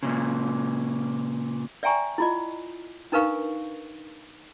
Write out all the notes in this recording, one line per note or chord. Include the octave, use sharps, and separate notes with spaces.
A#2 C#3
D5 E5 G5 G#5 A#5 C#6
E4 F4 D#5
D4 D#4 A#4 B4 F5 C#6